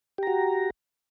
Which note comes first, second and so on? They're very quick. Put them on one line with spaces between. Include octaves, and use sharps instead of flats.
G4 A#5 F#4